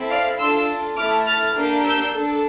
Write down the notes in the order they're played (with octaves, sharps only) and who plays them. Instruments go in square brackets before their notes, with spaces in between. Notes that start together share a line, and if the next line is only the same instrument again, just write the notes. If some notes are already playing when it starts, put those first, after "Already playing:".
Already playing: [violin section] C4 E4 A4
D5 F5
D4 F4 A4 C6 E6
A3 E4 A4 D6 F6
F6 A6
A#3 D4 G4
E6 G6
D4 A4